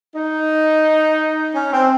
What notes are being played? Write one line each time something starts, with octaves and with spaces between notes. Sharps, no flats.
D#4
C#4
C4